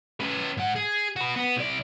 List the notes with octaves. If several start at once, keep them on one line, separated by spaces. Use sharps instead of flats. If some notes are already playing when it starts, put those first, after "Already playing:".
C#4 B4
G#2 F#5
G#4
F#4 B4
B3
C2 D5